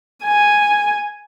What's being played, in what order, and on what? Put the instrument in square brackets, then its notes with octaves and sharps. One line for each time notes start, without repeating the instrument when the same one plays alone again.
[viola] G#5